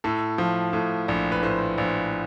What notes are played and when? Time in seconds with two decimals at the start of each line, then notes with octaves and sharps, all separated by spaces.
0.04 A2 A4
0.38 F3
0.73 A2
1.08 A#1
1.32 B4
1.43 A2 C5
1.78 A#1